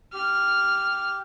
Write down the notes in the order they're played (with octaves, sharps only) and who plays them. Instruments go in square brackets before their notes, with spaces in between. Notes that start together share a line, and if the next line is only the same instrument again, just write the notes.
[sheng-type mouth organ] G4 [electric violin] F6